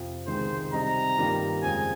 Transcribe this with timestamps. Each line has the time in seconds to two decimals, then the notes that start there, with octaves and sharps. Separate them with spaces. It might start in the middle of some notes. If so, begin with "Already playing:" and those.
Already playing: F2 C3 F3
0.27 C#2 C3 D#3 G#3 C5
0.73 C3 G3 C4 D#4 A#5
1.17 G2 D#3 G3 A#3 F4
1.63 F2 C#3 G#3 G#5